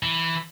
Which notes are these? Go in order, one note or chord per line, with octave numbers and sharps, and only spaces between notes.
E3